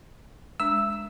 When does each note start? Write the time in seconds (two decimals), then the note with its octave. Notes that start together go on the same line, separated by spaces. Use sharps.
0.60 G#3 D4 E6